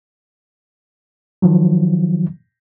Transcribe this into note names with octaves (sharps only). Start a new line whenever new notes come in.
D#3 F3 F#3